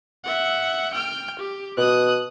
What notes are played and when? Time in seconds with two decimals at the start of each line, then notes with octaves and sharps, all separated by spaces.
0.24 E5 F#5
0.93 G5 F6
1.39 G4
1.78 B2 D#6 F#6